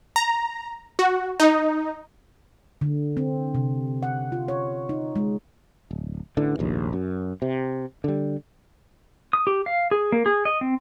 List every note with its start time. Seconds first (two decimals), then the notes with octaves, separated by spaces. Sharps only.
0.16 A#5
0.99 F#4
1.40 D#4
2.81 D3
3.17 C4
3.54 C3
4.03 F#5
4.32 F4
4.48 C#5
4.89 D#4
5.16 G#3
5.91 D1
6.37 A1 D3 E3
6.59 F1 A#1 D#2
6.93 F#2
7.42 C3
8.04 D3 G3
9.33 D#6
9.47 G4
9.66 F5
9.91 G#4
10.12 A#3
10.26 G#4
10.45 D#5
10.61 C4